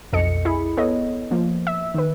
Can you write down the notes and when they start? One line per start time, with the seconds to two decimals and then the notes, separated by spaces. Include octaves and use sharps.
0.13 B1 F2 A4 D#5 C#7
0.45 E4 G#4 B5
0.77 B3 A4 C#5 D#5
1.31 F3 A#3
1.67 E5 E6
1.94 D#3 B4